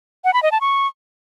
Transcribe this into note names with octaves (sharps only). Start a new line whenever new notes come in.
F#5
B5
D#5
A5
C#6